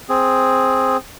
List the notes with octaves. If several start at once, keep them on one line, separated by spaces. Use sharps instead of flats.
C4 G#4